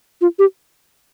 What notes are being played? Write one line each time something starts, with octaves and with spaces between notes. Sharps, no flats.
F4
G4